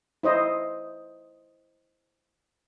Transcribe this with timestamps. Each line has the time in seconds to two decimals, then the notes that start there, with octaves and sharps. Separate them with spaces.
0.23 E4 C5 D#5